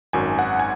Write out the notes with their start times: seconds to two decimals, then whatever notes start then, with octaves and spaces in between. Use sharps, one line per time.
0.13 G#1 F#2 D#3 F#3 G#5
0.39 F#5
0.59 G#5